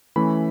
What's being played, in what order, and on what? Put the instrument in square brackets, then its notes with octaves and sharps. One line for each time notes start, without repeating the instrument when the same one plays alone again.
[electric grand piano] E3 A3 C#4 B5